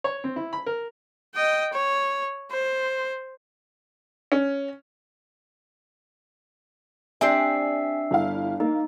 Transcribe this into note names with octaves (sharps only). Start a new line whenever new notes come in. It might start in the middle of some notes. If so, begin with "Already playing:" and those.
C#5
C4
E4
B5
A#4
D#5 G5
C#5
C5
C#4
C4 D4 G4 E5 G#5 E6 C7
G1 E4 F5
A#3 D#4 A#4